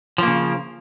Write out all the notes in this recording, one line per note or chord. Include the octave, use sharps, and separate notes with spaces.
C#3 F3 A#3